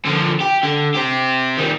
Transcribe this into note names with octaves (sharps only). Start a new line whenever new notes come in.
D3 F3
G4
D3
C4 G4
D#3 G3